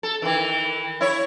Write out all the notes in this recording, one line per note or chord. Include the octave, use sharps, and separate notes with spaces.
A4
D#3 E3
E4 C#5